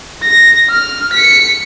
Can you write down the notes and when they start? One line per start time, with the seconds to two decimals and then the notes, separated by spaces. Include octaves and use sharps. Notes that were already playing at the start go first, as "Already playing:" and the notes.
0.23 A#6
0.70 F6
1.14 B6 C#7